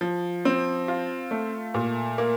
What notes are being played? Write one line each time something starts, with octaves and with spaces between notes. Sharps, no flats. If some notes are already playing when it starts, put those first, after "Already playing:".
F3
C4
F4
A3
A#2
A#3